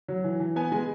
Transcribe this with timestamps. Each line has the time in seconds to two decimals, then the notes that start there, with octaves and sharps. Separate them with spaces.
0.08 F#3
0.24 E3
0.40 E3
0.56 B3 G#5
0.72 G#3 G#5